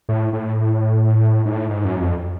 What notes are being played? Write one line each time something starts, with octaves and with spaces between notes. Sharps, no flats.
A2
A2
G#2
A2
G#2
F#2
F2